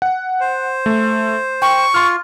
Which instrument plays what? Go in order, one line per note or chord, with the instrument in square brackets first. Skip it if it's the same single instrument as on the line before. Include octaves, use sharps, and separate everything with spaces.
[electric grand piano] F#5
[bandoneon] C5
[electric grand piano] A3
[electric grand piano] G5 [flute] C#6
[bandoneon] F4 [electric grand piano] C6 F6